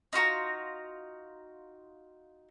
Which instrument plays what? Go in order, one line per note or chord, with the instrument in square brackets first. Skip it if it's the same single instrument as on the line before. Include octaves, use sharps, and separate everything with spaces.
[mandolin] D#4 F4 F#4 A#5